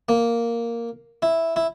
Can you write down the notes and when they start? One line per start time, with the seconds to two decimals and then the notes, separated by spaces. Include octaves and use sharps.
0.09 A#3
1.22 E4
1.56 E4